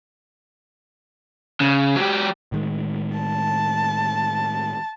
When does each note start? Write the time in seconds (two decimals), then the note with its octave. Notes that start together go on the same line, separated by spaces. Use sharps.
1.60 C#3
1.96 F#3 G4
2.52 A2 D#3 G#3
3.18 A5